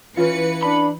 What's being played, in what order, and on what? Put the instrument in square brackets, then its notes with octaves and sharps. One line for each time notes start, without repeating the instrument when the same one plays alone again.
[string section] E3 B4 C#7 [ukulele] C#4 F4
[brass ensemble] D4 [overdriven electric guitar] B5